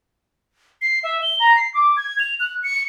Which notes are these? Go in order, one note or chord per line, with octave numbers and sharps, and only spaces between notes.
C7
E5
G7
A#5
C7
D6
G#6
F7
F#6
C#7